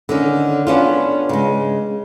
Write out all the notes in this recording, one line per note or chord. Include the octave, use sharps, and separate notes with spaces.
D3 D#3 C#4
B3 C#4 D4 F4
C#3 G#3